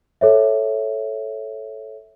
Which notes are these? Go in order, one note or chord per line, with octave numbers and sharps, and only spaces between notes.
A4 C#5 E5